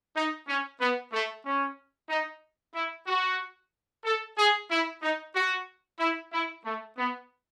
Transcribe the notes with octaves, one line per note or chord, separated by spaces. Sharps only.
D#4
C#4
B3
A3
C#4
D#4
E4
F#4
A4
G#4
E4
D#4
F#4
E4
E4
A3
B3